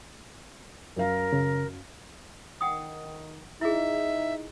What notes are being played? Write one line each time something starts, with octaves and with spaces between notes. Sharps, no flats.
F#2 A#4 F5
C#3
D#3 F#5 G5 D#6
D#4 E4 G#4 E5